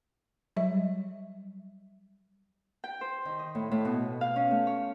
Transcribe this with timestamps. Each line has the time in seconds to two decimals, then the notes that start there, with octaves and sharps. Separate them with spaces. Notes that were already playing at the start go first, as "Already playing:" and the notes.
0.56 F#3 G3 E5
2.84 G5
3.01 C5
3.25 D#3
3.39 D#5
3.55 A2
3.71 A2
3.85 B2
4.21 F5
4.36 C#4
4.51 A3
4.67 C#5